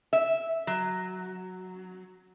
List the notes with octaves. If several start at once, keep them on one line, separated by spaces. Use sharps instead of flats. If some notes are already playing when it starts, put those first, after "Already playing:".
E5
F#3